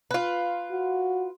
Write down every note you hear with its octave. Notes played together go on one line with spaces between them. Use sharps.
F4 B4
F#4